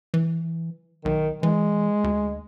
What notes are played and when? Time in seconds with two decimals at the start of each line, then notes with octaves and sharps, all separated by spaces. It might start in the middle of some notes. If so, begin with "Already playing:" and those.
0.14 E3
1.05 B1 D#3
1.43 E3 G#3
2.04 D2